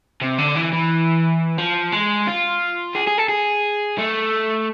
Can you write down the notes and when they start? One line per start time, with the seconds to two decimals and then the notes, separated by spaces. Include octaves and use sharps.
0.22 C3
0.39 D3
0.56 E3
0.73 E3
1.58 F3
1.92 G#3
2.27 F4
2.95 G#4
3.07 G#4
3.18 A4
3.29 G#4
3.98 A3